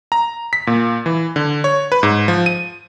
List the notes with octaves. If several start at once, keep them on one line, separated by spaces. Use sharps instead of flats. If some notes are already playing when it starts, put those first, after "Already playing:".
A#5
B6
A#2
E3
D3
C#5
B4
G#2
F3
D#7